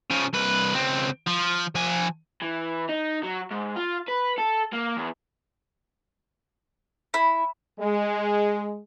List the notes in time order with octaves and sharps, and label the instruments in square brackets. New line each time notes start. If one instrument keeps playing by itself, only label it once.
[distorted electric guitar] C#3 F3
C2 B4
C#2 C4
F3
F3 G#5
[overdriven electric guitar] E3
D#4
F#3
G#2
F4
B4
A4
A#3
E2
[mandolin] E4
[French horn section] G#3